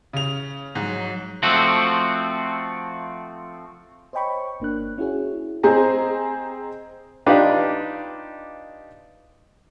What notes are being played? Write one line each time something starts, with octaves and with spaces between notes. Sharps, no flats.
C#3 F7
G#2 F#3
F3 A3 C4 F#4
C5 C#5 D#5 G5 B5 C#6
G1 A#3 D4 F#6
C#4 E4 F#4 G#4 C#5
C4 G#4 C5 D#5 A#5
D4 D#4 F4 G4 B4 F5